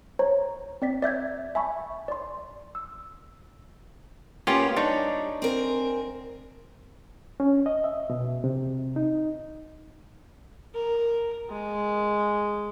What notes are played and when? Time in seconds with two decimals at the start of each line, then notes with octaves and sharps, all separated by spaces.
0.19 C5 C#5 A#5
0.82 C4 D5 B6
1.02 D5 E5 G6 G#6
1.55 E5 G#5 A5 B5 C#6
2.08 D5 C6
2.75 E6
4.47 A#3 B3 C#4 F4 G4
4.76 G3 D4 D#4 C#5
5.42 C4 A#4 G#5
7.40 C#4
7.66 D#5
7.84 E5
8.10 B2
8.44 C3
8.96 D#4
10.74 A#4
11.49 G#3